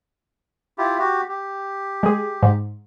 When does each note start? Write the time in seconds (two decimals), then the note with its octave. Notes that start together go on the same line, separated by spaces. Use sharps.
0.78 E4 F4 G4
0.99 F#4 G4
1.28 G4
2.03 G#3 G#4
2.43 G#2